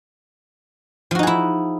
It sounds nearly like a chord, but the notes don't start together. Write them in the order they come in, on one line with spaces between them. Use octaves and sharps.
F3 F#4 D#4 G#4 E4